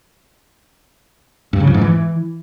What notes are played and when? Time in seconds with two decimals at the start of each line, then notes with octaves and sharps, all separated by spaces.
1.53 G2
1.60 C#3
1.67 F2
1.74 G#2
1.81 E3